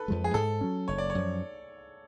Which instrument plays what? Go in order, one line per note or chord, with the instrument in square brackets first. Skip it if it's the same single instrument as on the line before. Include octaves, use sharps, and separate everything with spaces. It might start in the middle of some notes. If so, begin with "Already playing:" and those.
Already playing: [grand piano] A4 B4
[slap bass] F2 F3 G#3
[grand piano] G#4
[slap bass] G#2 [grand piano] A4
[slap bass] F#3 C#4
[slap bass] F#1 [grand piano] C#5
[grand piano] D5
C#5
[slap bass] F#2 F3